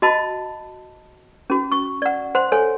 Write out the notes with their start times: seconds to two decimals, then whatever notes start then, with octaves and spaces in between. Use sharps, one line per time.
0.02 F#4 D#5 A5 B5
1.50 C#4 F#4
1.72 C#6
2.02 D5 F#5
2.35 C5 F#5 C6
2.52 A4 C#5 G#5